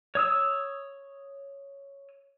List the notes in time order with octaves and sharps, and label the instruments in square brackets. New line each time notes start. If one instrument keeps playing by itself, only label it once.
[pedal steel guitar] C#5 D#6 E6